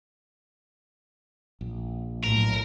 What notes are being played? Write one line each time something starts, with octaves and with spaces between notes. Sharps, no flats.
A#1
B1 A2 A#4